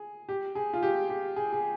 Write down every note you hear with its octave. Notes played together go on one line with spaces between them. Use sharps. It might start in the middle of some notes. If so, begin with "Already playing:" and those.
Already playing: G#4
G4
G#4
F4
G4
G4
G#4
G#4